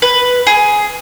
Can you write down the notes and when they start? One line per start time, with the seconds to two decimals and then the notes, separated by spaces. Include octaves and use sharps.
0.02 B4
0.47 G#4